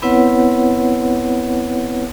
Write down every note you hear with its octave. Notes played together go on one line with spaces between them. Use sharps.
B3 C4 E4 B4 C#5 F#5